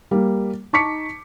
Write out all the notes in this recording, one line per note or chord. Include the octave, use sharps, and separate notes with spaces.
G3 A#3
D#4 A5 C#6 D6 B6 C#7